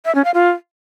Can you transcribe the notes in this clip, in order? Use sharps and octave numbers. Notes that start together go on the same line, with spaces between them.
E5
C#4
F5
F4